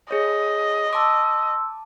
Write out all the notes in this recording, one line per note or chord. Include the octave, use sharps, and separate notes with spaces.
G#4 C#5 D#5
A5 C6 D6 E6